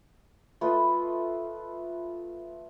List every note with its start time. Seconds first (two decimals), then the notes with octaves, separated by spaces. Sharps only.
0.61 A3 F4 B4 D#5